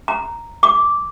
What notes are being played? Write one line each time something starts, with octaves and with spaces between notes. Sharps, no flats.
A#5
D6